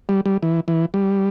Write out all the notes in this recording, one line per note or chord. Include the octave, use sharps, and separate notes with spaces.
G3
G3
E3
E3
G3